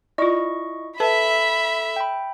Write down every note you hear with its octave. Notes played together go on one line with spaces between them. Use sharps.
E4 F4 D5 D#5 C#6
A4 B4 E5 A5 B5
G5 B5